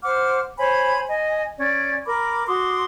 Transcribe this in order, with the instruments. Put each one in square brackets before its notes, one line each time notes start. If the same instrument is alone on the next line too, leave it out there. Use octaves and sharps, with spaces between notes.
[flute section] C5 F#5 D6 F6
C5 C#5 G#5 B5
D#5 G#5
C#4 D5
A#4 B5 D6
F#4 C6 D6 D#6